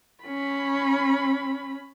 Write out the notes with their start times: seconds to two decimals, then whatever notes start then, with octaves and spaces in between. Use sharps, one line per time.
0.24 C#4 B5